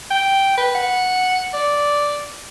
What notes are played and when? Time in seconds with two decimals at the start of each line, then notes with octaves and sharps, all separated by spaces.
0.11 G5
0.57 B4
0.75 F#5
1.54 D5